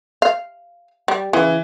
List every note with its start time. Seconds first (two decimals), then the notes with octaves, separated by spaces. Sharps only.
0.22 F5
1.08 G3
1.33 C#3 E3